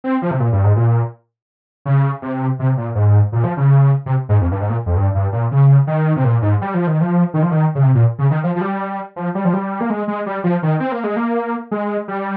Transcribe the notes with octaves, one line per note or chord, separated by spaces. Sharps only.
C4
F3
C3
A#2
G2
G#2
A#2
C#3
C3
C3
A#2
G#2
A#2
F3
C#3
C3
G#2
F2
G2
G#2
A#2
F2
G2
G2
A#2
C#3
D#3
C3
A#2
G#2
G3
F3
D#3
F3
D#3
F3
D#3
C#3
C3
A#2
C#3
D#3
F3
F3
G3
F3
G3
F3
G3
A#3
G#3
G#3
G3
F3
D#3
C4
A#3
G#3
A#3
G#3
G3